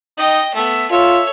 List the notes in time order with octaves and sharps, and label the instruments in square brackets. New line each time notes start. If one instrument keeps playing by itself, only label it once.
[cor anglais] D#4 [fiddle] D#5 G5
[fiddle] A3 B3 [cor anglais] E5
[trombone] F4 [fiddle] A4 C#5 [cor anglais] E5